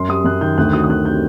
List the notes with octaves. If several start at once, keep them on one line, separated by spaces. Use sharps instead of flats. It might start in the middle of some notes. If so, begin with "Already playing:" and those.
Already playing: F#2 C6
G3 D#6
F#2 F#6
D#3 G6
D2 F#6
F#3 D#6
D#6
D2 F#6
C3 G6